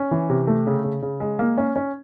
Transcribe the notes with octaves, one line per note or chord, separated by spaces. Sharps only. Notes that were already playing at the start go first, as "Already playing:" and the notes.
Already playing: C#4
E3
C3
A3
C#3
C#3
C#3
G#3
A#3
C#4
C#4